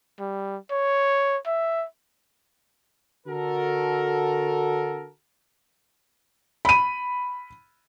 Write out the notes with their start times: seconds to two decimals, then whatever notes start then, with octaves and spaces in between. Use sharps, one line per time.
0.19 G3
0.71 C#5
1.46 E5
3.27 D3 F#4 A4 A#4
6.65 B5 D#7